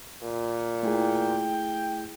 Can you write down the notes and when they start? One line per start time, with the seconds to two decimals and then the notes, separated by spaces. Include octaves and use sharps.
0.23 A#2
0.83 A3 E4 G#4 G5